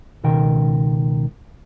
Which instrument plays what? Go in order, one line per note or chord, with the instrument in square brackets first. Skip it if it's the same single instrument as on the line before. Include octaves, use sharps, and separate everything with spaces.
[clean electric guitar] C#2 B2 D#3 A#4 G5